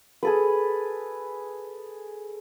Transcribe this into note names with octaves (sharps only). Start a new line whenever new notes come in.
G#4 A4 B4